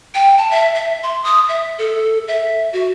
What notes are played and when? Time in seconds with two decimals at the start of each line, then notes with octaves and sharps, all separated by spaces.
0.15 G5
0.38 A5
0.51 E5
0.75 E5
1.03 C6
1.24 D#6
1.49 E5
1.78 A4
2.28 E5
2.73 F#4